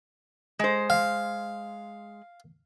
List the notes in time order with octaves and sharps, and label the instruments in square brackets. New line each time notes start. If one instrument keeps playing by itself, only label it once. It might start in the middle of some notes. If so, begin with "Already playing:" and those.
[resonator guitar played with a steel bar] G#3 C5
[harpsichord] F5